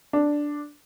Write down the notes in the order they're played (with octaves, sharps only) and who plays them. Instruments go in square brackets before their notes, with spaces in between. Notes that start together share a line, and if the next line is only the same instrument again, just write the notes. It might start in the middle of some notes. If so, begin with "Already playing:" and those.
[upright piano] D4